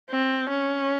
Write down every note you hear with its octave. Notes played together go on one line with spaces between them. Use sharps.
C4
C#4